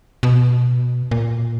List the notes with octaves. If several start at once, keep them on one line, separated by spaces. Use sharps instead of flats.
B2
A#2